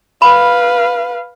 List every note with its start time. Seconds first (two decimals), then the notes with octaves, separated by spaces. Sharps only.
0.22 B4 F5 B5